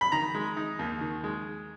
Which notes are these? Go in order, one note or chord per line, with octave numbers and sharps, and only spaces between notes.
B5
D#3 A#5
G#3
D#4
D#2
D#3
G#3